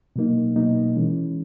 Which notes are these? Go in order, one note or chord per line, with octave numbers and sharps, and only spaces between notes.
B2 F#3 A#3 D#4
B2 F#3 A#3 D#4
E3 G#3 C#4